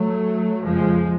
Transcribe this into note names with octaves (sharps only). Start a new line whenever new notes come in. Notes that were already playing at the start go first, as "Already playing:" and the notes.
Already playing: F#3 A3
F2 C#3 F3 G#3